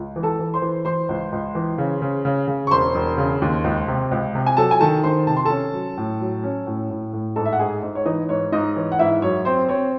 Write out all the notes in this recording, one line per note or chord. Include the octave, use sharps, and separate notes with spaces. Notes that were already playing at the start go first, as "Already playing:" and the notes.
Already playing: C#2
E3
A4 A5
E3
C5 C6
E3
E3 C5 C6
C#2
C#2
E3
C#3
C#3
C#3
C#3
C#6
E1 C5 C6
E1
C#3
D#2
C#2
C3
C#2
C3
G#5
F#3 A4 A5
G#5
D#3 A4 A5
D#3 C5 C6
C3 A5
C6
C#4 A4 A5
F#3
A2
F#3
C#4
A2
A2
A2
G#2 A4 A5
E5
F#5
G#2 G#4 G#5
G#2
C#5
E3 D#4 D#5
G#2 C#5
G#2 D#4 D#5
E3 C#5
F#5
G#2 E4 E5
F#2 C#5
C4 C5
C4 C#5